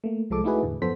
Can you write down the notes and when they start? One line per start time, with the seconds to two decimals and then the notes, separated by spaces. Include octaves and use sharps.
0.04 A3 A#3
0.30 C2 F3 G#3 A4 D6
0.44 A3 D#4 E4 F#4 G#4 B4
0.63 E2 A2 D3
0.82 F#2 F3 B3 A4 C5 B6